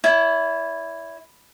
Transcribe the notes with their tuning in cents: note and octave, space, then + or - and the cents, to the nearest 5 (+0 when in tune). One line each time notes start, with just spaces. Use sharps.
E4 +0 C#5 +45